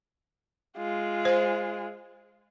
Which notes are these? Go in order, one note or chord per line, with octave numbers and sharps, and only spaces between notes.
G#3 F4
C5